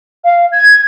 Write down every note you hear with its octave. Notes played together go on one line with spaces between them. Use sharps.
F5
G#6